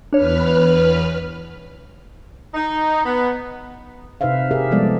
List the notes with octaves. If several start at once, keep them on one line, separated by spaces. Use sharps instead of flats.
E2 D4 B4 C#5 F6
D#4
B3
C3 D#4 B4 C5 E5 F5
G4 G#4 A#4 E5
F3 G3 G#3 B3 A4 D5